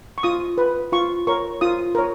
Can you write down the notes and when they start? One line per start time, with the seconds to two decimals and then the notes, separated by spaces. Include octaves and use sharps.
0.18 C#6
0.23 F4 D#6
0.58 B4
0.92 F4 C#6
1.27 A#4 C#5 C#6
1.61 F4 D#6
1.95 A#4 C#5